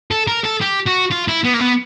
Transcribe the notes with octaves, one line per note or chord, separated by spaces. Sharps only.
A4
A#4
A4
G4
F#4
F4
E4
B3
A#3
B3